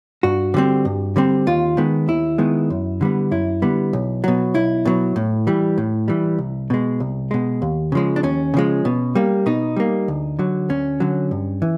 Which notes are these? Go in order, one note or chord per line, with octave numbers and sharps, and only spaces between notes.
G2 F#4
D3 G3 C4
G2
D3 G3 C4
D#2 F4
D#3 G#3 B3
D#2 E4
D#3 G#3 B3
F#2
D3 G3 B3
F#2 E4
D3 G3 B3
B1
B2 F#3
B1 E4
B2 F#3
A2
E3 G3
A2
E3 G3
C2
B2 G#3
C2
B2 G#3
D#2
C#3 F3 G#3
D4
D#2 C#4
C#3 F3 G#3
B2
G3 A#3
B2 D#4
G3 A#3
D2
D3 F#3
D2 C#4
D3 F#3
G2
E3